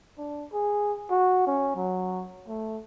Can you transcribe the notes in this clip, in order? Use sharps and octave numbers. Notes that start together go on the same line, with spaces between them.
D4
G#4
F#4
C#4
F#3
A3